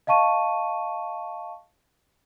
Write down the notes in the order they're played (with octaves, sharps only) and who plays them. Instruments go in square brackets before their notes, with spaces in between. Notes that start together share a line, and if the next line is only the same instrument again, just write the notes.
[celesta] D#5 F5 A5 C#6 D#7